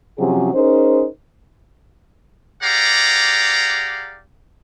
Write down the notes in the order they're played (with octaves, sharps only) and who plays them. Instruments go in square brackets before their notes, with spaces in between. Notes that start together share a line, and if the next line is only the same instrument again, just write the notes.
[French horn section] C3 F3 F#3 C#4 G#4
C#4 D#4 G#4 A#4 C5
[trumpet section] G4 G#4 D5 F5 F#5 A#5